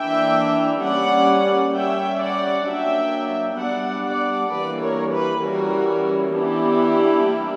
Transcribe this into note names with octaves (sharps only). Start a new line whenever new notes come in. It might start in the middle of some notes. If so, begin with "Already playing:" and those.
Already playing: E3 A#3 D4 E5 G5
G3 A#3 C#4 D5 F#5
G3 C#4 E5 G5
D5 F#5
F#3 A#3 D4 E5 G5
G3 B3 D4 D5 F#5
D5 F#5
E3 G3 A#3 D4 B4 D5
A#4 C#5
G4 B4
E3 G3 C#4 F#4 A#4
E3 B3 D4 E4 G4
G3 A#3 D4